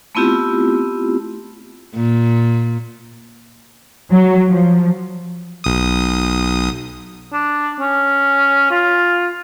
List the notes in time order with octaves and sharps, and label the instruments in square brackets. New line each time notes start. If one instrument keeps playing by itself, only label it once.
[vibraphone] A3 B3 C4 E4 F4 G4
[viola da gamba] A#2
[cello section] F#3
F3
[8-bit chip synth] B1 D#6
[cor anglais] D4
C#4
F4